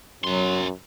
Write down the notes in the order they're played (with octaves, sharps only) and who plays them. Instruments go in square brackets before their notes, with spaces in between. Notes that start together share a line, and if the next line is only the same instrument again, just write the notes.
[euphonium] F#2 [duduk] F#3 [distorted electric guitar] F#4 C6